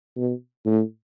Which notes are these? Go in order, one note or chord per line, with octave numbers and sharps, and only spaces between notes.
B2
A2